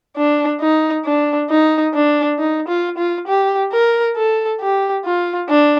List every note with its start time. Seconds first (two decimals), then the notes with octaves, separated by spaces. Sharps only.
0.16 D4
0.60 D#4
1.05 D4
1.49 D#4
1.94 D4
2.39 D#4
2.68 F4
2.97 F4
3.27 G4
3.72 A#4
4.16 A4
4.60 G4
5.05 F4
5.49 D4